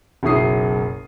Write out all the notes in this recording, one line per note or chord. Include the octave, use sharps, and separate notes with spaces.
F#1 B1 E4 D#6 C7